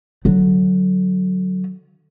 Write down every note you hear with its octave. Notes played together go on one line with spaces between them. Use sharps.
D3 F#3